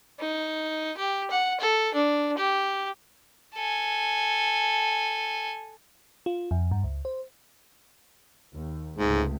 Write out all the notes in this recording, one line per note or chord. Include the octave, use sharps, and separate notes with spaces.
D#4
G4
F#5
A4
D4
G4
A4 G#5
F4
F2
G2
C#2
C5
D#2
C#2 G#2 C3 A3